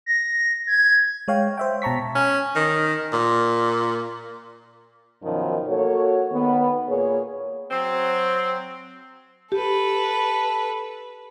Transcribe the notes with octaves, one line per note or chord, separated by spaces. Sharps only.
A#6
G#6
G#3 C#5 F5 G5
C5 E5 G5
B2 A5 A#5 C#6 B6
C#4
D#3
A#2
F#2 B2 D#3 F3
A#3 F#4 A4 C#5
D#3 B3
A#2 A#3 G#4 C#5
F#3 C4
G4 A4 B4